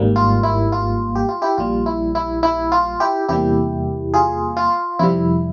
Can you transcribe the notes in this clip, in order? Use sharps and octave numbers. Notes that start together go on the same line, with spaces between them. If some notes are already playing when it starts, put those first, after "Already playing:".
Already playing: G#1 G#2 G3 A#3
F4
E4
F4
G4
F4
E4 G4
A#1 A#2 G3 F4
E4
E4
E4
F4
E4 G4
E2 C3 G3 A#3 E4 G4
F4 G#4
F4
F2 C3 G3 E4